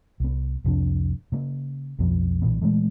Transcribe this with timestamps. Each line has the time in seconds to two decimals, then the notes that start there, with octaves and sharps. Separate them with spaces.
0.20 C2 B3
0.64 C2 F2 C3 D4
1.32 C#3 A#3
1.99 B1 F2 F3 B3
2.42 B1 A#2 E3 B3
2.61 A#2 E3 G#3 A3